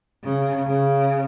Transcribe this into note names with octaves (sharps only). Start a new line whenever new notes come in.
C#3
C#3